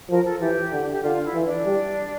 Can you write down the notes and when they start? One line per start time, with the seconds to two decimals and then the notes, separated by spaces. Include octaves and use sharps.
0.10 F3 A#4
0.24 A4
0.40 E3 G4
0.72 D3
0.92 G4
1.03 D3 F4
1.24 E4
1.35 E3
1.45 D4
1.66 G3